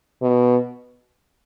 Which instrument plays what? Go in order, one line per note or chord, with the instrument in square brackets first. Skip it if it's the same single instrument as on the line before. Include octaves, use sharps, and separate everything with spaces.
[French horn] B2